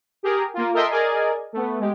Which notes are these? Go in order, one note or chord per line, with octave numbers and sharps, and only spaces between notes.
G4 G#4 A#4
A#3 F4
A4 A#4 D#5 E5 G5 C6
G#4 A#4 D5 D#5 G#5
A3 B3
G#3 G4